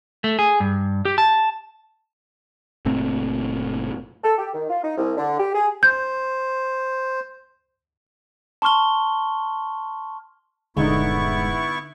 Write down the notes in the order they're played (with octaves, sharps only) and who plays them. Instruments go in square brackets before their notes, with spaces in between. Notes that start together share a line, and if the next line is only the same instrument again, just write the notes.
[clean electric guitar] A3
G#4
G2
G4
A5
[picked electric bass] F#1 A#2 A3 C4
[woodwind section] A4
G4
D#3
F4
D#4
C2
D3
G4
G#4
[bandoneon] C5 [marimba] G6
[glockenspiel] A5 C6 C#6 F6 G7
[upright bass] D#1 G2 [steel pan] D3 D#4 [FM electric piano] G#3 [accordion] B3 E4 C#6